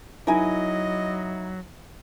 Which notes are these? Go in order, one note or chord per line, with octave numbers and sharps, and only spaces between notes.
F#3 D#4 E4 A#4 D#5 G#5